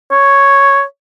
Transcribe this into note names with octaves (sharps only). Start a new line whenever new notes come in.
C#5